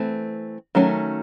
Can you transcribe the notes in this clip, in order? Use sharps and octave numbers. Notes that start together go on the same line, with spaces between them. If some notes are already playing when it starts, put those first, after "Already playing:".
Already playing: E3 A3 C4
D#3 F#3 A3 C#4